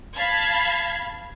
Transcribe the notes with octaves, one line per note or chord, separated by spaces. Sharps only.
F5 A5 B5 G#6 C7